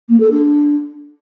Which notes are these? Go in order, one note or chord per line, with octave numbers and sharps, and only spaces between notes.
A#3
A4
D4